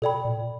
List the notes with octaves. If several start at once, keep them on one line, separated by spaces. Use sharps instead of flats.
B2 A4 D5 G5 B5
A#2